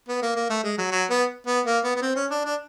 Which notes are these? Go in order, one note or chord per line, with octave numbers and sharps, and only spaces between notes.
B3
A#3
A#3
A3
G#3
F#3
F#3
B3
B3
A#3
B3
B3
C4
C#4
D4
D4